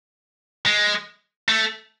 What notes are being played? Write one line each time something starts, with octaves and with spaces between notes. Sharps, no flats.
G#3
A3